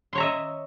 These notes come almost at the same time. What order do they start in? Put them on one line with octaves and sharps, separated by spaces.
C6 C#5 A#5 E5 D#5